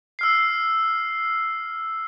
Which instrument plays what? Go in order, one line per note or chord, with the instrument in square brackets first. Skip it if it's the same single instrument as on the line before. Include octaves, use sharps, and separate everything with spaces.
[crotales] E6 F6 C7